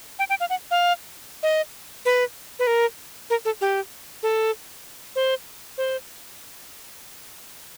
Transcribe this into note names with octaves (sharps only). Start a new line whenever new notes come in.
G5
G5
F5
F#5
F5
D#5
B4
B4
A#4
A#4
A4
G4
A4
C5
C5